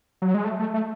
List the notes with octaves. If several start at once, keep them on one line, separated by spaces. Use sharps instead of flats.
F#3
G#3
A3
A3
A3